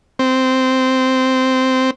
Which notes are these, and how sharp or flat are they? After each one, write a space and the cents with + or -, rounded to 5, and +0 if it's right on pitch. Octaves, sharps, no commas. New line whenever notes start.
C4 -10